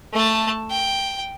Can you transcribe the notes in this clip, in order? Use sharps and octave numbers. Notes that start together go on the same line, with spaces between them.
A3 A5
G5